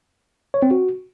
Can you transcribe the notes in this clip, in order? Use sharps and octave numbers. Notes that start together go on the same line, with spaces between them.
C#5
C4
F#4